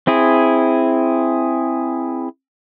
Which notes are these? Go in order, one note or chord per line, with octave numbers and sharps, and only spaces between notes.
C4 E4 G#4